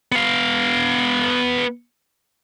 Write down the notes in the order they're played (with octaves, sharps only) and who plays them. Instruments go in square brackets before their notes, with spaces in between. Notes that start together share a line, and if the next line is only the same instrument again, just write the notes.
[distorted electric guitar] B3 F5